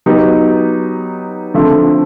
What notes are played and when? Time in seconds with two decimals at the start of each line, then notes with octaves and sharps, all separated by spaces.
0.06 F#3 B3 D#4 G4
1.54 D3 F3 A3 C4